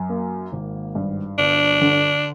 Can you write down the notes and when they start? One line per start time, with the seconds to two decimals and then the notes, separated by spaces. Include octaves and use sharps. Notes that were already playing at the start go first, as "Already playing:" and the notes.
Already playing: F#2
0.09 A#3
0.52 G#1
0.95 G2
1.38 G1 D4
1.82 D3